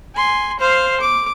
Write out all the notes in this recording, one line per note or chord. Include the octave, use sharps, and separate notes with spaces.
G#5 C6
C5 F5
D6